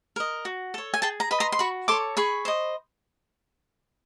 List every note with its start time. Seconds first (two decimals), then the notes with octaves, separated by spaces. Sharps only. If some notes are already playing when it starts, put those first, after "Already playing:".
0.16 A#4 D#5
0.45 F#4
0.74 A4 C#5
0.94 G#5
1.02 G#4 G5 A5
1.20 A#5
1.31 B4 D#5 B5
1.40 A#5 C6
1.52 C6
1.59 F#4 B5 C#6
1.88 A4 C#5 C6 D6
2.17 G#4 B5 C#6
2.45 C5 D#5